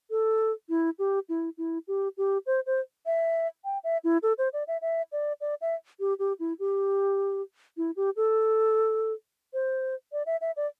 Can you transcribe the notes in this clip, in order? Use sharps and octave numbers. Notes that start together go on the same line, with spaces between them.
A4
E4
G4
E4
E4
G4
G4
C5
C5
E5
G5
E5
E4
A4
C5
D5
E5
E5
D5
D5
E5
G4
G4
E4
G4
E4
G4
A4
C5
D5
E5
E5
D5